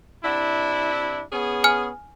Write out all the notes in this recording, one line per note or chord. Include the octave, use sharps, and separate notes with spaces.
C3 D4 E4
B3 C#4 G#4
G#5 F6